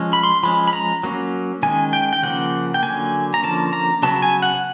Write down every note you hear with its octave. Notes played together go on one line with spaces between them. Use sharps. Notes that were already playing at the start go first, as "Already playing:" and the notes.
Already playing: F3 G#3 C#4
B5
C6
F3 G#3 C#4 B5
B5
A#5
F#3 A#3 C#4
D#3 G#3 C#4 G#5
G5
G5
C#3 F3 A#3 C#4 F#5
G5
D3 F#3 A#3 G#5
A#5
D3 F3 A#3 C#4 A5
A#5
C#3 F#3 B3 A5
G#5
F#5